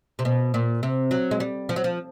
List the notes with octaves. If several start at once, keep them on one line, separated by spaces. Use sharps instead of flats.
C3
B2
A#2
C3
F#3
G#3
G3
F3
F#3
F3